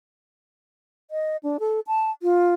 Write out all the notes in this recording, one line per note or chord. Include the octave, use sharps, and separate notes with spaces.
D#5
D4
A4
A5
F4